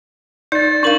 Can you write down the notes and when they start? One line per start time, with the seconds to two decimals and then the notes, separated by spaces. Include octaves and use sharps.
0.52 D#4 D5 G6 A6
0.83 D4 A#4 F5 C#6 F#7